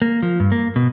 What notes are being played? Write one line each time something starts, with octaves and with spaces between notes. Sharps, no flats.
A#3
F3
G2
A#3
B2